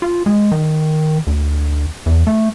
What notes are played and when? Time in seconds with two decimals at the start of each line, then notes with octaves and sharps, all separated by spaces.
0.02 F4
0.26 G#3
0.52 D#3
1.27 D2
2.06 E2
2.27 A3